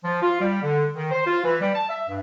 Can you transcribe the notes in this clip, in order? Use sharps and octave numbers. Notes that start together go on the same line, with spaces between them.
F3
F4
G3
D3
D#3
C5
F4
E3
G3
A5
E5
G2